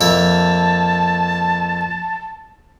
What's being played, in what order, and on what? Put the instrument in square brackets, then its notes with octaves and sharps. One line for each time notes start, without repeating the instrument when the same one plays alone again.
[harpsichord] F2 A#3 E5 [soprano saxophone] A5